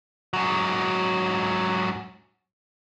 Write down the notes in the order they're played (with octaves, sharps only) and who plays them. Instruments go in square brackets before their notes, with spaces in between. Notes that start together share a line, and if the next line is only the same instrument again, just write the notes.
[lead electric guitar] G#2 F#3